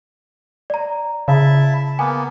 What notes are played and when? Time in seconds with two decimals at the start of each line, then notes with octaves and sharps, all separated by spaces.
0.70 D5 A#5
1.28 C#3 E4 E5 A5
1.99 A#3 B3 G#5